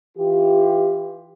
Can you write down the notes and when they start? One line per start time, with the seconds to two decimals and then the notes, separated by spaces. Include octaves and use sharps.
0.17 E3 F4 G4